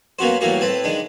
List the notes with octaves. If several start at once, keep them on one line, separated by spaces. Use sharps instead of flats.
A#3 B3 C#4 F#4 C5
A2 E3 G3 A#3 F#4
A2 C4 B4 A5
D#3 G#3 D4